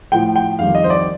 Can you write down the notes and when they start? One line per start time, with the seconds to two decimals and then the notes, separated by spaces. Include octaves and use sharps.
0.12 A2 F3 G5
0.36 G5
0.59 F2 D#3 G3 F5
0.75 D#5
0.84 C5
0.90 D5